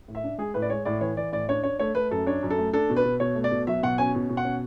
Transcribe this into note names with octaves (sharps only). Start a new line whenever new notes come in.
A2
E5
D4
G#3 G#4
A2 B4
D5
G#3 C#5
A2 D5
E3 C#5
E3 D5
A2 D5
D4 C#5
D4 C#5
A3 C#5
A3 B4
F#2 A4
D4 C#5
F#2
A4
A3
D4 A4
B2
B4
B2
B2 C#5
A3
D5
B2
F#3 E5
B2 F#5
C#4 G#5
B2
B2
F#5
C#4